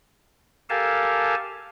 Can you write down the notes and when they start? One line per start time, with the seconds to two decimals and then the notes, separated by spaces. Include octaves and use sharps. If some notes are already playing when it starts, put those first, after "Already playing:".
0.70 G4 A4 A#4 F5 G#5 A5